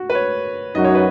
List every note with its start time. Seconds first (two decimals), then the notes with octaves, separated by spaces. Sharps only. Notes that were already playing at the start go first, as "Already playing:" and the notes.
Already playing: F#4
0.10 B4
0.15 C#5
0.74 F#2 F#3 D#4 F#4 D#5
0.84 C#5
0.94 B4